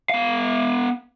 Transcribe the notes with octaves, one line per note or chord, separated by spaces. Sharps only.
B3 F5